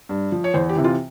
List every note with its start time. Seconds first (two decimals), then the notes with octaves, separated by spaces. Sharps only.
0.09 G2
0.32 F3
0.44 C#5
0.54 E2 C5
0.69 G4
0.76 C3 E3
0.84 F4